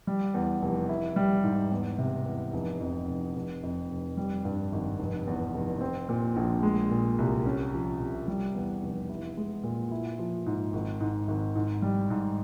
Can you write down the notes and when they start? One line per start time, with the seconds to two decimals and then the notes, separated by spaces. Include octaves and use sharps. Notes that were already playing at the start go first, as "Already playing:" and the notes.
0.07 G3
0.34 E2
0.62 F1
0.89 E4
1.16 G3
1.44 G#2
1.72 E2
1.98 C3
2.26 E2
2.53 F1
2.80 F2
3.07 F1
3.35 F1
3.63 F2
3.89 F1
4.17 G3
4.45 G2
4.72 G#1
4.99 F1
5.27 E2
5.54 F1
5.81 C4
6.09 A#2
6.36 A#1
6.63 G#3
6.91 A#2
7.18 C2
7.46 C#4
7.73 F3
8.00 C3
8.28 G3
8.55 E2
8.82 F1
9.09 E4
9.37 G#3
9.63 A#2
9.91 E4
10.19 F3
10.46 G#2
10.73 G#1
11.00 G#2
11.28 G#1
11.55 G#2
11.82 G3
12.10 G#2